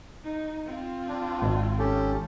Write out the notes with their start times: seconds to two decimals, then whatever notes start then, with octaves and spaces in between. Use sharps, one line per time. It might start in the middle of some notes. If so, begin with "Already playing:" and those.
0.24 D#4
0.66 C4 F4
1.09 D4
1.42 G#1
1.79 C#4 G4 A4